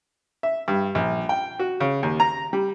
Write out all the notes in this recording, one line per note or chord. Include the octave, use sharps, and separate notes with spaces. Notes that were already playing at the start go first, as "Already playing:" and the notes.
E5
G2
A#1
G5
F#4
C#3
D#2
A#5
G3